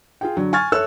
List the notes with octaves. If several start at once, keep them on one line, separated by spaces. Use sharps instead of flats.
F4 G#4 G5
D3 F#3
G#5 C#6 F6 G#6 A6
A4 C#5 E5 E6 F#6